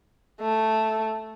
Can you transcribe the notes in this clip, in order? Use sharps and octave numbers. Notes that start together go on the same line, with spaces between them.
A3